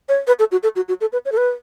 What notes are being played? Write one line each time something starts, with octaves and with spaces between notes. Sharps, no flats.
C#5
B4
A4
F#4
A4
F#4
F#4
A4
B4
C#5
A4
B4